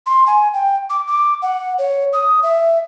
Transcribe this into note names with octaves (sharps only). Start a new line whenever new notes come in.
C6
G#5
G5
D6
D6
F#5
C#5
D#6
E5